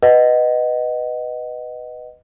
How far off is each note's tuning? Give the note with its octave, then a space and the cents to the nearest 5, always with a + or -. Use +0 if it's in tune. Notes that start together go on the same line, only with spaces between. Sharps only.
B4 +0 D#5 +0 F#5 +10